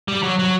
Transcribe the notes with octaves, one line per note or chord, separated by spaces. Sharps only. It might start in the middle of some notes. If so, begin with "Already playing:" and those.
G3
F#3
F#3